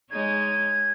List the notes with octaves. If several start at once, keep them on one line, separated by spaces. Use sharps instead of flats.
G#3 D#4 C#5 G#6